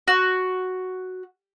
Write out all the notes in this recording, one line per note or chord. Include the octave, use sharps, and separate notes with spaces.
F#4